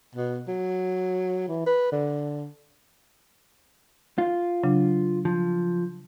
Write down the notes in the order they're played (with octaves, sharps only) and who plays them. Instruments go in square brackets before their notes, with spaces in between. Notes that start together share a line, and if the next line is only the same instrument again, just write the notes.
[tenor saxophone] B2
F#3
E3
B4
D3
[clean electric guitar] F4
[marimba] C#3 F#3 D4
[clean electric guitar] F3